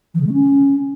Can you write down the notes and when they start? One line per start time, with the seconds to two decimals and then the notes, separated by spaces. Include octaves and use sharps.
0.14 E3
0.21 C#3
0.27 G#3
0.33 C#4